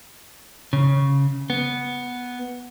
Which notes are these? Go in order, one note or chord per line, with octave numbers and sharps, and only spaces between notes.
C#3
B3